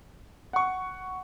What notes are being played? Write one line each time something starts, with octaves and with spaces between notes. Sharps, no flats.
F#5 C#6